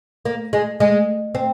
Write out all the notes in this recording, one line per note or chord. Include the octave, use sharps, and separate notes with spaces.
A#3
G#3
G#3
C4